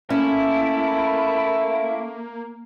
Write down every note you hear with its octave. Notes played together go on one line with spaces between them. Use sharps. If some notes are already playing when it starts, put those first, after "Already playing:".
A3 A#3 C#4 E4